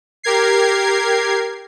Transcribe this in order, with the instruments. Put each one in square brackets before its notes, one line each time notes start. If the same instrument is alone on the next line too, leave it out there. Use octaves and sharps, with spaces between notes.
[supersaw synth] G4 A#4 G#6 C7